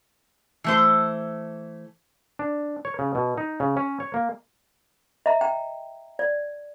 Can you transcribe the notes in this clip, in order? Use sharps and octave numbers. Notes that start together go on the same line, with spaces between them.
E3 A3 C5
D4
C#5
C#3
B2
D#4
C#3
C#4
C#5
A#3
D#5 E5 A#5
G5 A#5
D5